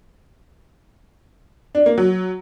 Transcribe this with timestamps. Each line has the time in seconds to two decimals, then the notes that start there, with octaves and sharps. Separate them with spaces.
1.75 D4
1.86 A#3
1.98 F#3